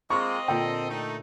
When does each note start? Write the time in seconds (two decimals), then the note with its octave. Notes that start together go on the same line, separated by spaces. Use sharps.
0.10 G#3 A#3 C4 F4 D#5 C#6
0.48 A#2 D3 A4 G5
0.90 A3 D#4